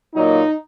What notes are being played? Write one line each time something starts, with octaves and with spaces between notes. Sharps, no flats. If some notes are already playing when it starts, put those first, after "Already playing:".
A#2 F#3 A#3 D#4